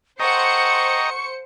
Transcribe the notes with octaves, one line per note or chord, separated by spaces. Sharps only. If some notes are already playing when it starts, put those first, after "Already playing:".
A4 C5 D#5 F#5 G5 A#5 C#6 C#7